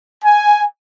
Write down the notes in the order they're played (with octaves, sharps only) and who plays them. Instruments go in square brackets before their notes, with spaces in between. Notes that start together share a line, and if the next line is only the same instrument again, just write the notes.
[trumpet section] G#5